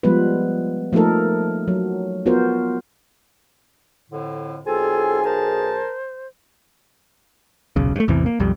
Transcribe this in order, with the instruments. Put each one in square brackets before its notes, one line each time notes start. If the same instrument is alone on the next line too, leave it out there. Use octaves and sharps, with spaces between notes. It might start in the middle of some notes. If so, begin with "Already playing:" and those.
[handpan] F3 G3 G#3 B3 F4 B4
F3 A3 A#3 D#4 A4 A#4
F#3
B3 F4 F#4 A#4 C5
[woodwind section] F2 A2 D3
[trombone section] B1 G#4 [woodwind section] C4 F4 G#5 [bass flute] A4
[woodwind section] A#4 A5 [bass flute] C5
[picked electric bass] D#1 B1 C#3
G2 A3
A1 E2 C3 E3
A#3
B1 F2 G3